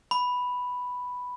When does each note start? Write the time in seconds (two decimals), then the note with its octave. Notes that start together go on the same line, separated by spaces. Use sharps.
0.11 B5